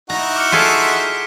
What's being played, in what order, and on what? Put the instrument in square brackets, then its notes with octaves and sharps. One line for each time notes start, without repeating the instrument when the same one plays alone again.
[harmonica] D#4 E4 F#4 [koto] A#5
[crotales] D6 F6 C#7
[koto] F4 G#4 A4 [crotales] B6 D7